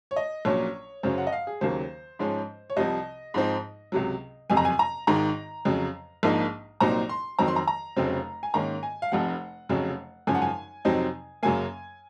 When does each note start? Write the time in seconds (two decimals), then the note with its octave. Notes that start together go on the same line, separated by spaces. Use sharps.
0.11 C#5
0.16 D#5
0.45 A#1 A#2 F#3 C#4 C#5
1.03 F#2 C#3 F#3 C#4 C5
1.18 F#5
1.27 D#5
1.32 F5
1.47 G#4
1.61 D#2 C#3 F#3 A#3 C5
2.19 G#2 F3 G#3 C#4
2.70 C#5
2.76 C2 C3 F3 D#5
3.34 G#2 F3 C4 D#4
3.92 C#2 C3 F#3
4.50 F#1 F2 C3 G#5
4.57 A#5
4.65 G#5
4.79 A#5
5.07 G#1 G#2 D#3 A#5
5.65 F2 C#3 F#3
6.23 A#1 G#2 F3 A#3 D#4
6.80 C2 A#2 F#3 C4 D#4 A#5
7.09 C6
7.39 F2 D#3 F#3 C4 A#5
7.48 C6
7.56 A#5
7.68 A#5
7.96 F1 F2 C#3 F#3 C4
8.43 G#5
8.54 G#2 D#3 A#3 C#4 A#5
8.83 G#5
9.02 F5
9.12 F1 F2 C3 F3 F#5
9.69 F1 F2 C#3 F#3 C#4
10.27 G#1 F#2 C#3 F3 G#5
10.34 F#5
10.42 G#5
10.85 F2 C3 F#3 C4 D#4
11.43 F#2 C#3 F#3 A#3 G#5